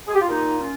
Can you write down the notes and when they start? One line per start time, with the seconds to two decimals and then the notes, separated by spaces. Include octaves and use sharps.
0.08 G#4
0.14 G4
0.21 F4
0.29 A#2 D#4
0.60 C#4 F4